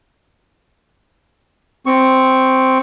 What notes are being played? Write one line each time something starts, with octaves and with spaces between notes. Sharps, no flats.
C4 C#6